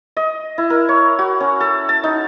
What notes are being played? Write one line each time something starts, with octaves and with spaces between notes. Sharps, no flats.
D#5
E4
A#4
C#5
F#4
C#4
A4
A5
D#4